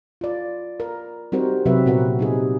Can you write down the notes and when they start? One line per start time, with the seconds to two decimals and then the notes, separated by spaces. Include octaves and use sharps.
0.21 F4 D5
0.80 A#4
1.32 G3 C4 D#4 F#4 A#4 C5
1.66 C3 F#3 C4 F#4 B4 E5
1.86 A#2 B3 F#4 A#4 F#5
2.19 G3 D#4 G#4